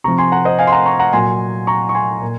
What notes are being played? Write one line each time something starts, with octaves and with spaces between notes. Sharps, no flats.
C3 F3 A#5 C#6
G#5 C6
F#5 A#5
C5 D#5
F5 G#5
C6
F#5 A#5
A#5 C#6
F#5 A#5
A#2 F#3 G#5 C6
A#5 C#6
C#6
G#5 C6
A#2